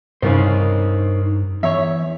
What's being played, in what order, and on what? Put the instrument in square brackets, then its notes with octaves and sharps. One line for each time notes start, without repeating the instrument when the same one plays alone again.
[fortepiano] C2 C#3 [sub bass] G2 [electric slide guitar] D#4 A#4 C5
[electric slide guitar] E2 [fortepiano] C#5 E5